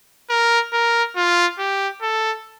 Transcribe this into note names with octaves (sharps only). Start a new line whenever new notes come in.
A#4
A#4
F4
G4
A4